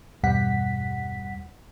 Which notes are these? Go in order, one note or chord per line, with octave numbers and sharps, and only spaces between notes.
E2 G2 B2 G3 F#5 B6